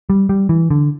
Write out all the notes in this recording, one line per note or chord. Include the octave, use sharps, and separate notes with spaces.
G3
G3
E3
D3